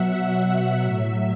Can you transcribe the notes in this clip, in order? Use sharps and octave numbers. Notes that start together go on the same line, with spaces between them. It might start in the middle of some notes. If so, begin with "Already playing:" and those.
Already playing: B2 F#3 E5 F#5
F#5
A2 F#3 E5